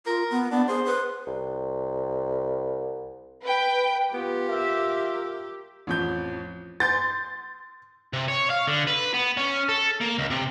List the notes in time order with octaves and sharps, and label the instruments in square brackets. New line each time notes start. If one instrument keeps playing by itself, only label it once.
[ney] F4 [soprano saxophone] A#4
[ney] B3
[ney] B3 [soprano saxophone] D4
[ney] G#4 [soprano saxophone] C5
[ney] B4
[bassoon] C2
[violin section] B4 G5
[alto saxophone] B3 [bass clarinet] F4 [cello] G4
[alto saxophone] A#4 [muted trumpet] E5
[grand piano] A1 F2 G6
[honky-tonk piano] C6 G6 A6
[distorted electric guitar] C3
C#5
F5
D3
B4
B3
C#4
A4
A#3
C#2
C3